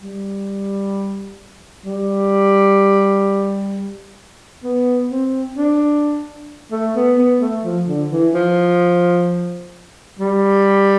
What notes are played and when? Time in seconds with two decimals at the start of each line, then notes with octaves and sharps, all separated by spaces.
0.01 G3
1.86 G3
4.64 B3
5.10 C4
5.56 D4
6.72 A3
6.96 B3
7.18 B3
7.41 A3
7.64 F3
7.87 D3
8.10 E3
8.34 F3
10.19 G3